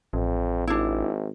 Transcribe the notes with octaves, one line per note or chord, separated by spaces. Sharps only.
A1 F2
G#1 D4 E4